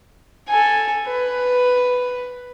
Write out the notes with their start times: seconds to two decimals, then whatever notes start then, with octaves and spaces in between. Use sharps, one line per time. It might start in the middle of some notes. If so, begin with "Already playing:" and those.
0.48 A4 G#5
1.07 B4